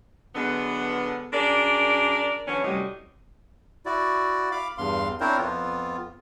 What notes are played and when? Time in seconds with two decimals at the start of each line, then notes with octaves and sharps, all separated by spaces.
0.35 D3 F#3 G#3 B3
1.33 F#2 D4 G#4 A#4 D5
2.47 D3 E3 F#3 B3 C#4
2.63 F#2 A2 C3 F#3 G3 D#5
3.86 E4 F#4 D5
4.52 F5 B5 D6
4.78 E2 G2 F5 C6
5.20 C4 D4 E4 A#4 C5 C#5
5.38 F2 B3 F4